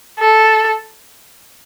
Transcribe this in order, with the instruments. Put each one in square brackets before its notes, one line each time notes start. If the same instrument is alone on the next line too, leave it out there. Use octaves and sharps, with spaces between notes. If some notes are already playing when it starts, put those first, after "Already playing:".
[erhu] A4